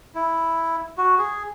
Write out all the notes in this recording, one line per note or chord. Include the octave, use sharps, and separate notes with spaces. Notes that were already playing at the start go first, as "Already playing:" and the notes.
E4
F#4
G#4